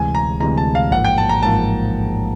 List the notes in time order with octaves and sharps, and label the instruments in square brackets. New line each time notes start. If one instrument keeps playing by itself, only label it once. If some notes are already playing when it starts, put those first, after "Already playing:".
Already playing: [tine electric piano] D2 C3 E3 G#3 [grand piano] G#5
[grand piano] A#5
[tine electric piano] D2 C3 E3 G#3 [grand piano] A#5
[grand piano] A5
F5
[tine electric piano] A1 G#2 F3 A#3 [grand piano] F#5
[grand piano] G5
A5
A#5
[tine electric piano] A1 G#2 F3 A#3 [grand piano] A5